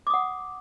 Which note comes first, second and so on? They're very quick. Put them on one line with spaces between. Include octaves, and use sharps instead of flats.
D6 D#6 F#5